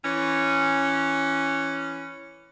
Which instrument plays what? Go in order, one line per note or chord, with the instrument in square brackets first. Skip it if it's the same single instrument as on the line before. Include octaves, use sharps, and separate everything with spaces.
[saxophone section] E3 C#4